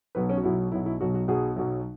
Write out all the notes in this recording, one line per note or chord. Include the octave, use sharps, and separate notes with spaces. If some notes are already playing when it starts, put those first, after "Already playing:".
B1 B2 F#3 B4
C#4
F#4
B1 B2 F#3 E4
B1 B2 F#3 E4
E4
B1 B2 F#3 F#4
F#4
B1 B2 F#3 G#4
B1 B2 F#3